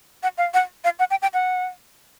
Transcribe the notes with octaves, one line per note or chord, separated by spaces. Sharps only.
F#5
F5
F#5
F5
F#5
G5
G5
F#5